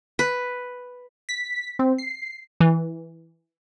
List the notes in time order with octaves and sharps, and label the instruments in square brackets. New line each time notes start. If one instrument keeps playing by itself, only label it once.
[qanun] B4
[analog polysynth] B6
C4
C7
[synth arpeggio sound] E3